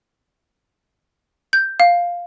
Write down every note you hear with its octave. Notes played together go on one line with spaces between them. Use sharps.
G6
F5